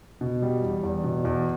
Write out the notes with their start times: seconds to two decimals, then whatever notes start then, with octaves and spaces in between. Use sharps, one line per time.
0.21 B2
0.42 G3
0.62 E2
0.84 E2
1.04 B2
1.25 E2